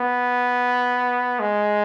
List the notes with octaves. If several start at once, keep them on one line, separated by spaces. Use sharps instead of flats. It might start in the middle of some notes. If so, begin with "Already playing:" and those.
Already playing: B3
G#3